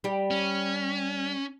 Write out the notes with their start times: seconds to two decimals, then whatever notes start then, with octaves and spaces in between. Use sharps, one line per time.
0.04 G3 G4
0.31 C#4